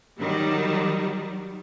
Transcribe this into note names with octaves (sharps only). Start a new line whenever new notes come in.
D#3 F#3 G3